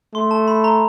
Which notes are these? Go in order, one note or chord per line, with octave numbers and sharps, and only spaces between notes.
A3 C6
A5
B5
A#5